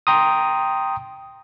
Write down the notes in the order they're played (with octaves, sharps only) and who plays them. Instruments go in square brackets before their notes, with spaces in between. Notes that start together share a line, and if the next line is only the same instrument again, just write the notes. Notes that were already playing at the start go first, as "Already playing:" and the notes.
[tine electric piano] G5 A#5 C6 D#6